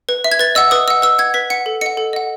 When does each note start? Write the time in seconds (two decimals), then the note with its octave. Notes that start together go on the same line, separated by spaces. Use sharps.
0.09 B4
0.24 E5
0.32 G#6
0.39 B4 A6
0.55 D#5 F#5 E6
0.71 B4 D#6
0.88 D#5 F#5 E6
1.02 B4 E6
1.19 F#5 G#6
1.34 B4 B6
1.50 F#5 C#7
1.66 A4
1.81 D#5 F#5 C#7
1.97 A4
2.13 D#5 F#5